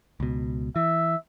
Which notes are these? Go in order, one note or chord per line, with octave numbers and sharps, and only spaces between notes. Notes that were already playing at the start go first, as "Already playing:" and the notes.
C#2 B2
E3 E5